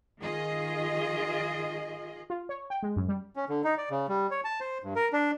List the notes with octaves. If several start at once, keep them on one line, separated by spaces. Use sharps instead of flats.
D#3 F4 G#4 D#5
F4
C#5
G5
G#3
F#2
G3
C#4
D3
D#4
D5
C#3
G3
C#5
A5
C5
G2
A#4
D4